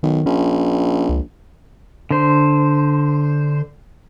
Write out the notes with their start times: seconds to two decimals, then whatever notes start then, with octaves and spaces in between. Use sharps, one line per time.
0.03 B1 D#3
0.26 A#1 C#4
1.09 C#2
2.11 D3 C5